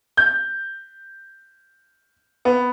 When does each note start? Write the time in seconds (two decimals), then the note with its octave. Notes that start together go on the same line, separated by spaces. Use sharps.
0.17 G6
2.45 B3